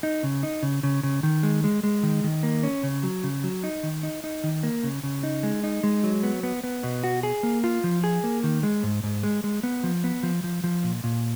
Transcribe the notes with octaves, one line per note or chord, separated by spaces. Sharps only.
D#4
C#3
D#4
C#3
C#3
C#3
D#3
G#3
G#3
G#3
D#3
D#3
A#3
C#4
C#3
F#3
C#3
F#3
D#4
D#3
D#4
D#4
D#3
A#3
C#3
C#3
D#4
G#3
D#4
G#3
F#3
B3
B3
B3
B2
F#4
G#4
A#3
F4
F3
G#4
A#3
D#3
G#3
G#2
G#2
G#3
G#3
B3
F3
B3
F3
F3
F3
A#2
A#2